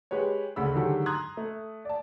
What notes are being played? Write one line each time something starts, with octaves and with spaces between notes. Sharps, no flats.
G#3 G4 B4 C#5
D2 C#3 B5 E6
D3 D#3 F#3 G#3 G4 A4
A#5 C6 D#6 F#6 G#6
A3
D5 A5